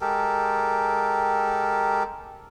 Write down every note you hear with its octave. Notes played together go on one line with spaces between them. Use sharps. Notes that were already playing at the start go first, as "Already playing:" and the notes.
G#3 G4 A4 A#4